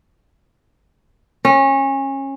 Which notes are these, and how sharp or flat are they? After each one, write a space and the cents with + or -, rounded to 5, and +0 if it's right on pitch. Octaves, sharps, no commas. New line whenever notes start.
C#4 -25